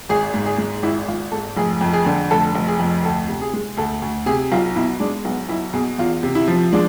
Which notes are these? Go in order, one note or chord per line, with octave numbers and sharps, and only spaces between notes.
G#1 G#4
G#2
G#4
G#3
G#1 E4
G#1 F4
G#2 A4
F1 G#4
F2
G#4
D3
F1 A4
F1
G#4
F2
D2 A4
C3
G#4
G#3
D2 A4
D2
C3 G#4
B1 F4
B2 E4
G#3 D4
B1 B3
B1 E4
B2 G#4
E2 F4
C3
E4
F3
G#3 D4